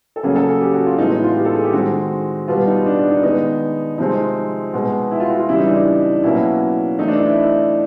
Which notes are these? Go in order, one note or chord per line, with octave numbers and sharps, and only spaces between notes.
A4
C#3 F#3 A#3 C#4 G#4
A4
G#4
G4
F#4
F4
A2 E3 G#3 B3 D#4
D#4
F4
G4
A4
G#4
G4
D#3 G#3 C4 F#4
B2 G3 B3 F4
D#4
D4
D4
D#4
D#3 G#3 B3 D#4
C3 F3 G#3 C4 D#4
B2 G#3 B3
E4
F4
F#4
F4
C#3 E3 G3 E4
D#4
D4
D#4
B2 F#3 A#3 C#4 E4
E3 A3 C4 D#4
D4
D#4
E4